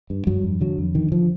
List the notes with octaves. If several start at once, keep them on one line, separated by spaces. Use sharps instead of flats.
G2
G2 F#3
F2
D3 F#3
F2
D3 D#3
D3 F3